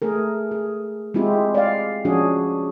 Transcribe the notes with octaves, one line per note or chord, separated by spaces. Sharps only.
A3 G#4 A#4
G#4
G#3 C4 E4 F4 G4
D5 F5
F3 C#4 D4 F#4 G#4